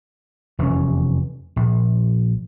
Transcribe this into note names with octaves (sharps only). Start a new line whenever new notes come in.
F1 E2 C4 C#4
A#1